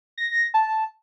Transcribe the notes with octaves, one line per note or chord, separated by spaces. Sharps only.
A#6
A5